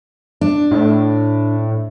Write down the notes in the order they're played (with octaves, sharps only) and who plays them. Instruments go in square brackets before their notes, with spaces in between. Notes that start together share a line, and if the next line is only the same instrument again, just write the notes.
[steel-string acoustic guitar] D4
[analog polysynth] A2